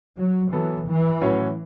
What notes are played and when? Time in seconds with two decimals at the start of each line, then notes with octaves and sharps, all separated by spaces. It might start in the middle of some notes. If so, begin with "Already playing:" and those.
0.18 F#3
0.52 E3 F#3 B3 A4
0.87 E3
1.21 A2 F#3 C#4 F#4 C#5